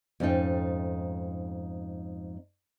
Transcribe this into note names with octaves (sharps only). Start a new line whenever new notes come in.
F2 G#2 A3 C#4 D#4 G5